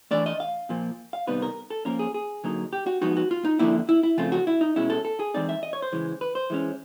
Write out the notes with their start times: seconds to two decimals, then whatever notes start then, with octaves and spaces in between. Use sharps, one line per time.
0.11 E3 A3 D4 D5
0.26 D#5
0.40 F5
0.69 A#2 F3 A#3
1.13 F5
1.27 C3 D#3 G3 B3 D#4 B4
1.42 A#4
1.70 A4
1.85 F3 A#3 C#4 A#4
1.99 G#4
2.14 G#4
2.44 D3 F#3 A#3 D#4
2.73 G4
2.87 F#4
3.01 F3 G#3 B3 D#4 F#4
3.17 F#4
3.31 F4
3.45 D#4
3.59 D3 F3 A#3 C#4 E4
3.89 E4
4.03 E4
4.18 C#3 F3 A3 C4 F4
4.32 F#4
4.47 E4
4.61 D#4
4.76 B2 G#3 C#4 E4
4.90 A4
5.05 A4
5.20 G#4
5.34 E3 G#3 C4 D#4 D5
5.49 E5
5.63 D#5
5.73 C#5
5.82 C5
5.92 C#3 E3 G#3
6.21 B4
6.35 C5
6.50 E3 G#3 C#4